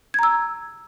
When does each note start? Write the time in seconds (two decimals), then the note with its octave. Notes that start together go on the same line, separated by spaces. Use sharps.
0.14 G#6
0.19 A#5
0.23 E6